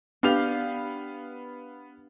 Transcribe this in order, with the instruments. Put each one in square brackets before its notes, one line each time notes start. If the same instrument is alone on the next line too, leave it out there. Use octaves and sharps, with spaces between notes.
[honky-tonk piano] B3 F5 F7 [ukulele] D4 G4